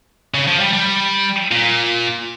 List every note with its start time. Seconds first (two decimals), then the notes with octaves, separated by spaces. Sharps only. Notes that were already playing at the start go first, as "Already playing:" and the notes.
0.34 C#3
0.48 F3
0.60 G3
0.73 G3
1.51 A#2